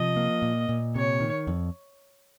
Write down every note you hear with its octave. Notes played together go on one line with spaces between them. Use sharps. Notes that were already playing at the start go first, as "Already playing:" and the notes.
Already playing: C3 F3 D#5
A#3
A#2
A#2
C3 C#5
D#3
F2